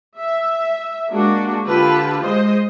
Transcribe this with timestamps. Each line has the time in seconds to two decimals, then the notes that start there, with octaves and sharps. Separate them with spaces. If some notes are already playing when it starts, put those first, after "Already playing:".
0.18 E5
1.09 G#3 A#3 D4 F#4
1.67 D3 F4 G4 B4 A5
2.22 G#3 C5 D#5